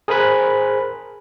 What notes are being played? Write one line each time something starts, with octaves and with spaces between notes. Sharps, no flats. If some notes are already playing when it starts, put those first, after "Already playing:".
G#4 A#4 C5 G#5 B5 F#6